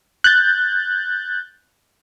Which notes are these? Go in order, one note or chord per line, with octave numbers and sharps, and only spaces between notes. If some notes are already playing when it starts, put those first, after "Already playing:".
F#6 G6 A6